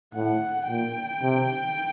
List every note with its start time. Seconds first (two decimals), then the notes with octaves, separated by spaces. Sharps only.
0.15 A2 F#5
0.68 A#2 G5
1.22 C3